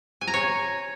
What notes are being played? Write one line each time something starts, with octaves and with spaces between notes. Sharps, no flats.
G#5
A#5
C#5